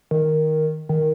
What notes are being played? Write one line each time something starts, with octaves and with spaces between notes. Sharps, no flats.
D#3
D#3